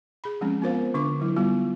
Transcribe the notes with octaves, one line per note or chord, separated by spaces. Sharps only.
G#4 B5
F3 G#3 C4 C#4
B3 F4 A#4 C5 F5
D3 D4 D6
F#3 E4
G3 B3 F4